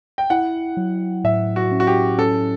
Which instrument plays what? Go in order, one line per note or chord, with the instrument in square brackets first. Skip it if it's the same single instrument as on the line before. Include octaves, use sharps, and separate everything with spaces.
[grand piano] G5
[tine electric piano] E4 [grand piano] F#5
[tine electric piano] F#3
[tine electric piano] A2 [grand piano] E5
[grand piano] F#4
[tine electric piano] C#4
[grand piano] F#4
G4
[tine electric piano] C#4 [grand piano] A4